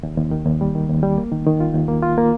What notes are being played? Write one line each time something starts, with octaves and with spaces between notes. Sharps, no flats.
D#2
D#2
D#3
D#2
G3
D#3
D#2
G3
A#3
D#3
D#3
F4
D#2
A#3
F4
A#3